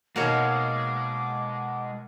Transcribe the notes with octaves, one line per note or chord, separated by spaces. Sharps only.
B2 G#3 A#3 D#4 F#4 A#4 C#5 D6